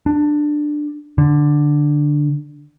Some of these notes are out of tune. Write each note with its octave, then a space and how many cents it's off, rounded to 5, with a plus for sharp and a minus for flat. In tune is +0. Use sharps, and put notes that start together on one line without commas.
D4 +15
D3 +5